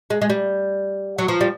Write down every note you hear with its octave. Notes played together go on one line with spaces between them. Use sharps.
G#3
G#3
G3
F#3
F3
G3